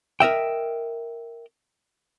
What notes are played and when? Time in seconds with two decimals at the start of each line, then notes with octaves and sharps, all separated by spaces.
0.20 A#4 D#5 E5 G5